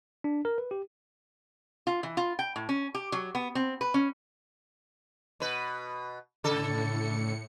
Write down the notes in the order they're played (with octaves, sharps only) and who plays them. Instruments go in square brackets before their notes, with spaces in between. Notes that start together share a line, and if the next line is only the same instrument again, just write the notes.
[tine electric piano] D4
A#4
B4
G4
[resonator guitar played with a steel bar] F4
E3
F4
G5
A2
C#4
G4
F#3
B3
C4
B4
C#4
[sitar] B2 B4
[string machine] A2 C#7 [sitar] C#3 A4